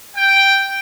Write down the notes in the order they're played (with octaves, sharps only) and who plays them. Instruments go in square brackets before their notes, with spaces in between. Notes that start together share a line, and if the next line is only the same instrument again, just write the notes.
[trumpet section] G5